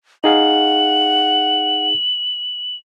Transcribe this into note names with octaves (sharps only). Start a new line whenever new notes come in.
D#4 G#4 F5 F#5 F#7